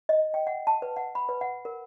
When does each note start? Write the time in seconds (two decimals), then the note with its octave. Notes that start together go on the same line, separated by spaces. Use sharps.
0.09 D#5
0.34 G5
0.47 F#5
0.67 A5
0.82 B4
0.96 F#5
1.15 B5
1.29 B4
1.41 F#5
1.65 A#4